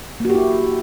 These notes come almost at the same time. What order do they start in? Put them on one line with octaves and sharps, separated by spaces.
A#3 F#4 G4 E4